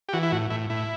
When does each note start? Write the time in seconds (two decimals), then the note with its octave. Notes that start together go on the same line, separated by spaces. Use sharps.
0.09 G4
0.13 E3 F#4
0.23 E4
0.32 A2 F#4
0.50 A2 E4
0.70 A2 E4